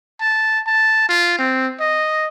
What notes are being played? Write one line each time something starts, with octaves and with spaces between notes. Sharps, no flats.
A5
A5
F4
C4
D#5